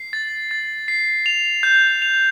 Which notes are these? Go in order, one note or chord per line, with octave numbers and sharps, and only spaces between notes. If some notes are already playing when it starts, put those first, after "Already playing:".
Already playing: C7
A6
A6
C7
F7
G6
F7